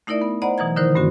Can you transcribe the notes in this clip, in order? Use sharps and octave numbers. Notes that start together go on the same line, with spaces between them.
A3 D#4 E4 A#4 D5 E5
B3
C5 D5 D#5 F#5 A#5 B5
B2 E3 F#3 A#5 G#6
D3 D#3 D#4 E4 A#4 C5
G2 A3 C4 C#4 F#4